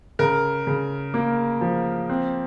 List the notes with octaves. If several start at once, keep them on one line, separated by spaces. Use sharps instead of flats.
C#3 A#4
C#3
A#3
F3
C4